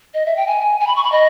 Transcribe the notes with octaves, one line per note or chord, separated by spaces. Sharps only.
D#5
E5
G5
G#5
G#5
B5
C#6
B5
D#5